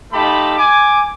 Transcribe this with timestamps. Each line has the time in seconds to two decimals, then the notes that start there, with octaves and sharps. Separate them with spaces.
0.12 A3 D#4 F4 G4 A5 B5
0.58 G#5 D6